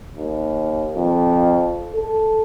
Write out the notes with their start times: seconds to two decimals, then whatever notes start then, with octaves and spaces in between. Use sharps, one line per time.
0.17 D#2
0.96 F2
1.95 A4